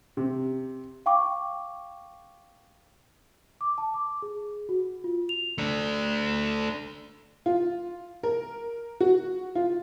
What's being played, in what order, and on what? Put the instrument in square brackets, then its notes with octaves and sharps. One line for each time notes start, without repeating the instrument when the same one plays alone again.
[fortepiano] C3
[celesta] F5 G5 C#6 D6
D6
A5
D6
G#4
F#4
F4
F7
[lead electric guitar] A3 D4
[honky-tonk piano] F4
A#4
F#4
F4